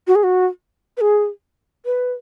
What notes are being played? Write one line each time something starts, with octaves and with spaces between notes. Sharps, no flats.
F#4
G#4
F#4
B4
G#4
B4